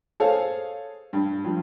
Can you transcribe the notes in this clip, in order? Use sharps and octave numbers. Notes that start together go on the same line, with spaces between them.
G#4 A4 C5 C#5 F5
G2
G2 F3